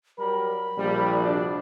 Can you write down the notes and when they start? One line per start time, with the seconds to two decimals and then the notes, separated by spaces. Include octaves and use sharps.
0.18 F#3 G3 A#4 B5
0.77 A#1 G3
1.21 C3 D4 F#4